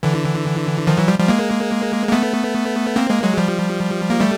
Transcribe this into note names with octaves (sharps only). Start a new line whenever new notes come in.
D3 E3
D#3 F3
E3 F#3
F3 G3
F3 G3
G#3 A#3
A#3
A3 B3
A#3 C4
G#3 A#3
F#3 G#3
F3 G3
A#3
G3 A3